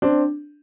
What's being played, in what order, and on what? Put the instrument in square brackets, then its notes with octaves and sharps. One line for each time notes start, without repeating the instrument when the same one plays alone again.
[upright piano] C4 D4